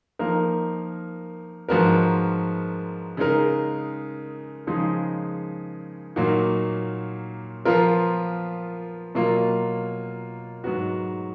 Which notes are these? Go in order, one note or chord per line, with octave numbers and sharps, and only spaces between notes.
F3 A#3 D#4 A#4
G#2 F3 B3 F#4 A#4
C#3 G#3 D#4 A#4
C#3 F3 G#3 D#4 G#4
A#2 F#3 A#3 D#4 F#4
F3 B3 F4 A#4
B2 F#3 A#3 F4
G#2 F#3 B3 F#4